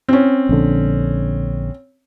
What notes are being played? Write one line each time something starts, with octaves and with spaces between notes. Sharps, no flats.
C4 C#4
A#1 D3